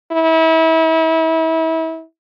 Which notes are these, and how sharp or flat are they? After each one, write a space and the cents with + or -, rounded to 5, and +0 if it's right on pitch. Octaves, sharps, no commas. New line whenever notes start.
E4 -35